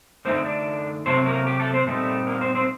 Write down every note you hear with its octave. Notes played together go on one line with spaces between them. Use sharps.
D3 A3 C4 D#4 C5
D4 D5
C3 F#3 A3 C4 C5
A#3 A#4
G4
A3 A4
C4 C5
A#2 G3 A3 C4 D#4 A4
A#3 A#4
C4 C5
C4 C5